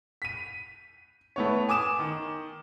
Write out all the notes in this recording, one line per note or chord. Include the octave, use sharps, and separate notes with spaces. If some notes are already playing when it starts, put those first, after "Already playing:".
B6 D#7
A3 B3 C#5
G#5 D6 D#6 E7
D#3